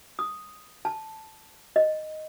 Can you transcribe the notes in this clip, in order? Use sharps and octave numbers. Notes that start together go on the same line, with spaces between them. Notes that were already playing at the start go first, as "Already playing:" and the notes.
D#6
A5
D#5